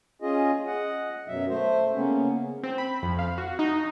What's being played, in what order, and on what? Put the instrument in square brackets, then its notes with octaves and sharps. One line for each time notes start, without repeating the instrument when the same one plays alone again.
[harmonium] C#4 F4 G#4 D#5
D#5 F#5
F#2 B2 F#3 E5
A3 C5
C#3 A#3 B3 C#4
[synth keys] C4
B5
F2
F5
F#4
D#4